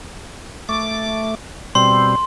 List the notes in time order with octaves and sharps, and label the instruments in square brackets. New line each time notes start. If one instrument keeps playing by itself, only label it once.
[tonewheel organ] A3 D6
[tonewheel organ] B2 G3 C4 [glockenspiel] C6